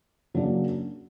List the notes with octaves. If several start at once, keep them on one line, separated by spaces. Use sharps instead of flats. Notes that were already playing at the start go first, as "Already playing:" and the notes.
C#3 F#3 A#3 D4